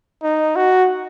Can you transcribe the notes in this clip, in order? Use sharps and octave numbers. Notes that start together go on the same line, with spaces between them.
D#4
F#4